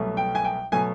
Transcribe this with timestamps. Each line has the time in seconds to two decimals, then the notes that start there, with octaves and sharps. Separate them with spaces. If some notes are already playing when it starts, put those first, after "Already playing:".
Already playing: C2 B2 F#3 A3
0.17 G5
0.35 G#5
0.44 G5
0.72 B2 F#3 A3 G#5